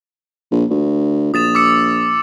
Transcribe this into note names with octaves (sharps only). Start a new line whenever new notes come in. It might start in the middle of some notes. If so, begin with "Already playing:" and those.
A#1
D2
A#1 D#6 A6 E7
D6 E6 C#7